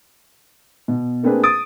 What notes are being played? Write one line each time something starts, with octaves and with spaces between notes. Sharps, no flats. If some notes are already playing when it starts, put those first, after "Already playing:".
B2
A3 A#3 C4 D4 G#4 B4
D#6 A6 D7